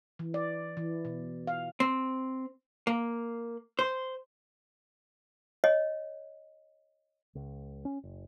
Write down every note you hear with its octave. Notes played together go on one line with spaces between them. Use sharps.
E3
D5
E3
B2
F5
C4
A#3
C5
C#5 D#5
C#2
C#4
F#1